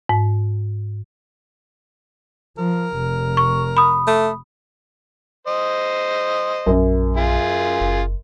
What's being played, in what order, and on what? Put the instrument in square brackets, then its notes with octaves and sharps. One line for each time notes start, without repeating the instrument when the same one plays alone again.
[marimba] G#2
[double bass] F3 [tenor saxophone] A#4
[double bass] F1
[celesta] C#6
B5 D#6
[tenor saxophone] A3
[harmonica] C5 D#5
[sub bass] A#1 [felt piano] F#2
[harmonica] F4 G#4
[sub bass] F#1